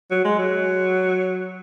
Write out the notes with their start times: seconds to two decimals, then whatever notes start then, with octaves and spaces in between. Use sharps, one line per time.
0.11 F#3
0.25 G#3
0.39 F#3